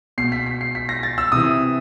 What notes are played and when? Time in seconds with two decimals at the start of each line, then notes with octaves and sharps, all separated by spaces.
0.18 B2 C7
0.32 B6
0.46 B6
0.61 C7
0.75 B6
0.89 A#6
1.03 A6
1.18 E6
1.32 C3 E3 D#6